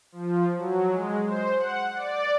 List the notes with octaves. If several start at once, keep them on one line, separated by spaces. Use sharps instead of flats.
F3
F#3
G#3
C5
F#5
D5